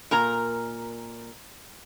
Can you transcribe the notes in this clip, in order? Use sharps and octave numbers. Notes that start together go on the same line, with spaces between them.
A#2 A#4 A#5